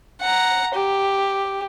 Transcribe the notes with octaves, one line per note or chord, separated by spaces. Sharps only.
F#5 A#5
G4